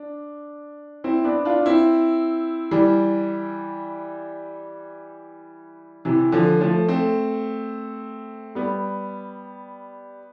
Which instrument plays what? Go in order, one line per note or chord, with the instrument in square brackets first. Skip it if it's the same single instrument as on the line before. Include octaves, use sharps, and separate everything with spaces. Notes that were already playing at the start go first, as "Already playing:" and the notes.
Already playing: [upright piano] D4
C4 E4
B3 D4
D4 F4
C4 E4
E3 G3
C3 E3
D3 F3
F3 A3
A3 C4
G3 B3